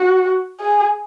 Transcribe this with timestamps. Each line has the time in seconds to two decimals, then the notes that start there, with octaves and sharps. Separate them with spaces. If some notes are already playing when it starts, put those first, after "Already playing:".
Already playing: F#4
0.60 G#4